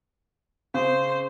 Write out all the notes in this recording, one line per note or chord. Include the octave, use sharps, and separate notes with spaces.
C#3 C5